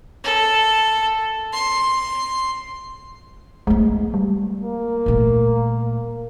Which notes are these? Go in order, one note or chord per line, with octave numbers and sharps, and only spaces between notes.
A4
C6
G#3 A3 B3
G3
A#3
A#2 A3